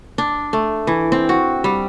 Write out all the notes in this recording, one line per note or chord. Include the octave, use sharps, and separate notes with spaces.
D4
A3
E3
C4
F#4
G3